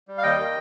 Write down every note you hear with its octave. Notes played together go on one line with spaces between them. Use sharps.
G3
F5
D#2 D#5 G5
D#3